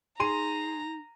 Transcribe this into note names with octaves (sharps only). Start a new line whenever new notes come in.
D#4 G#4 A#5 C6 D#7